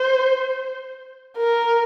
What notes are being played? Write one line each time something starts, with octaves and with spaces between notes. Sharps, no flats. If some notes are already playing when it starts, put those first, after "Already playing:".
Already playing: C5
A#4